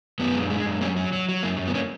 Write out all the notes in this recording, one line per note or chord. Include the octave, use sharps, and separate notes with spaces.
F#2 B3
G#3
G#3
F#2
F#3 A#3 C#4
F#3
F#3
F#3
F#2 A#3
F#2
B3
A#3 C#4